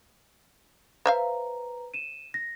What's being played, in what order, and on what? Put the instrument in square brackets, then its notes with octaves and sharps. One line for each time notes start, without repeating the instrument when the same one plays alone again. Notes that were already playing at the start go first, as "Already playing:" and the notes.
[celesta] B4 A#5 [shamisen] C5 E5 F5
[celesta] D#7 E7
A#6